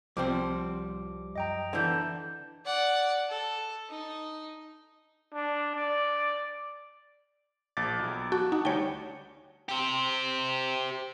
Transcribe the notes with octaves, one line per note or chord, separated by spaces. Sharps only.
C2 F3 G3 C4 D6
F#2 D#5 G5 A#5
D3 E3 D5 E5 A5 C6 G6
D5 F#5
A4
D#4
D4
D5
A#1 D6 A6
B1
F#4 A5
D#4 F#5
D2 G3 C#5 G5
G4 C5